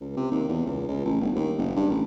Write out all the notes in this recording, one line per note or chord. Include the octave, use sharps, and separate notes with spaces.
C#2
C3
D#2
E2
C#2
C#2
A1
G1
D#2
F#1
G2
A1